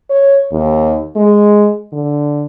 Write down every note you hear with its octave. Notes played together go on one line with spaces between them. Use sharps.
C#5
D#2
G#3
D3